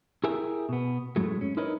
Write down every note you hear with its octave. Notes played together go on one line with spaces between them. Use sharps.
E4 G4 G#4 A#4 E5
B2 B3
F#2 A2 F#3 G#3 A3
C#4
D#4 E4 A#4 B4 C#5 D#5